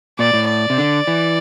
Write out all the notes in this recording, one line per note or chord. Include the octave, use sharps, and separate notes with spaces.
A#2 D5
A2
D5
C3
D3
E3